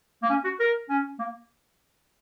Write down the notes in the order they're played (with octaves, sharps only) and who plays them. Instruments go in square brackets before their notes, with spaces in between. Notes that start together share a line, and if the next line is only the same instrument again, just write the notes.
[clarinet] A#3
C#4
F#4
A#4
C#4
A#3